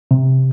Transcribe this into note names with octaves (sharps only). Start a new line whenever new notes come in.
C3